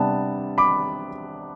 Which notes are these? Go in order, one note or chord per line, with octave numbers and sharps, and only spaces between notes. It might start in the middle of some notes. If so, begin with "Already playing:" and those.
Already playing: C3 G3 B3 D4 A5
B5 D6